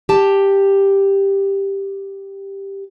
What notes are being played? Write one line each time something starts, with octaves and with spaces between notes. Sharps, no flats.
G4 A5